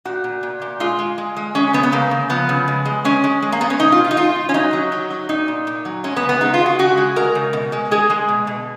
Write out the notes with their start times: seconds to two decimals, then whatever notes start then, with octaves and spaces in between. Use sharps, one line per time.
0.05 A#2 F#4
0.24 A#2
0.43 A#2
0.62 A#2
0.80 G#3 F4
0.99 G#3
1.18 G#3
1.36 G#3
1.55 G#3 C#4
1.73 C#3 B3
1.83 B3
1.92 C#3 A#3
2.11 C#3
2.29 F3 B3
2.49 C#3
2.68 G#3
2.85 G#3
3.04 G#3 C#4
3.24 G#3
3.42 G#3
3.52 A#3
3.61 G#3 B3
3.70 C#4
3.79 B2 D#4
3.92 F4
3.98 B2
4.04 F4
4.11 D#4
4.17 G#3 F4
4.35 B2
4.49 C#4
4.54 F#3 D#4
4.73 F#3
4.92 F#3
5.10 F#3
5.29 A#2 D#4
5.48 A#2
5.67 A#2
5.85 F#3
6.04 G#3 C#4
6.16 B3
6.23 C#3
6.29 B3
6.41 G#3 D#4
6.54 F4
6.60 G#3
6.66 F#4
6.79 C#3 F#4
6.97 G#3
7.16 G#3 A#4
7.35 C#3
7.53 B2
7.72 G#3
7.91 G#3 G#4
8.10 G#3
8.29 B2
8.47 B2